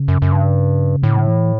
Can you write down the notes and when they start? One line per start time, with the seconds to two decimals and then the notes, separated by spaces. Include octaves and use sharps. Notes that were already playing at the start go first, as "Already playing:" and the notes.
Already playing: C#3
0.08 F#2
0.22 F#2
0.32 G2
1.03 A2 D3
1.10 C#3
1.17 D3
1.27 E3